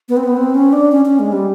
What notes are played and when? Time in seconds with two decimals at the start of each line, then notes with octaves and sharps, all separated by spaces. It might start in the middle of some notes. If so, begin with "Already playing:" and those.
0.09 B3
0.17 C4
0.23 B3
0.37 C4
0.54 C#4
0.73 D4
0.92 C#4
1.05 C#4
1.19 G#3
1.32 G3